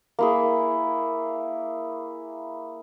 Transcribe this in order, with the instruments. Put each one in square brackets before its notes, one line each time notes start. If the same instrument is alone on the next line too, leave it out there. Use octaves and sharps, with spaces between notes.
[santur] A#3 E4 G#4